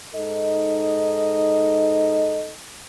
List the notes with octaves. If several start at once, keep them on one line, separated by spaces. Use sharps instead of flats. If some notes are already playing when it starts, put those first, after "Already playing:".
G#2 D#4 A4 D#5